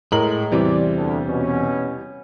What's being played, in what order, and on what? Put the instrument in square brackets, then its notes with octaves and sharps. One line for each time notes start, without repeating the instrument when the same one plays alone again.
[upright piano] A2 A#4 F#7 [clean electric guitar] G#3
[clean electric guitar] E2 C3 C4 [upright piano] E3 G3 [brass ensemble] D5
[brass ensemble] D2
B2 C#4